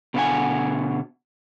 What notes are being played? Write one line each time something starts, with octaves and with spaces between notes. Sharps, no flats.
B2 D3 B3 E4 F#5 G#5